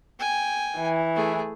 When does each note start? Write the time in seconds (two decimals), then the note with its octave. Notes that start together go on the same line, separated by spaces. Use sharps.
0.19 G5 G#5
0.78 E3
1.15 A3 G#4